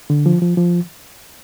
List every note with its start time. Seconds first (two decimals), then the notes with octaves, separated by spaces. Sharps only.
0.10 D3
0.26 F3
0.42 F3
0.57 F3